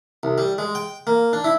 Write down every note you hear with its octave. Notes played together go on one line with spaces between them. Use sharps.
C2
G3
G#3
G5
A#3
D4
E4